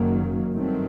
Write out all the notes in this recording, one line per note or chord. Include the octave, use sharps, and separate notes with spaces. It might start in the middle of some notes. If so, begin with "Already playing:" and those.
Already playing: F#1 F#2 D#3 F#3 A#3
G2 D#3 F#3 A3 C4